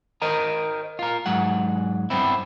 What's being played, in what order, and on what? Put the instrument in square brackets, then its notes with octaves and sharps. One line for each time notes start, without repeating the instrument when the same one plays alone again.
[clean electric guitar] A#4 C5 D#5 A#5
F4 A#4
G#2 F#3 G#3 F#5
G2 B3 C4 E4